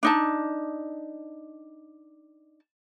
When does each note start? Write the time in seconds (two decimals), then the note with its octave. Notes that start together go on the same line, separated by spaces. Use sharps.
0.03 D4 D#4 A5